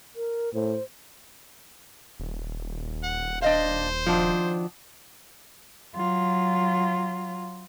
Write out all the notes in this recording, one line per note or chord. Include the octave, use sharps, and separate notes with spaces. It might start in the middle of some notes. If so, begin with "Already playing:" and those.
A#4
A2 C5
D#1
F#5
D4 C5 D#5 F5
D#3 F3 D4 F#4
F#3 F4